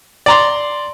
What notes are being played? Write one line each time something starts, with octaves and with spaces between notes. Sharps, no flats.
D5 A#5 C6